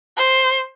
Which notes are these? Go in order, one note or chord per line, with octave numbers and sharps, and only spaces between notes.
C5